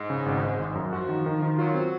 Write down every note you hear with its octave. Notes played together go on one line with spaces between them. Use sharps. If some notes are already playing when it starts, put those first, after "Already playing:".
Already playing: G#2
C#3
G#1
G#1
G#1
F#2
F3 F#4
D#3
D#3
D#3
F#3 F4
C4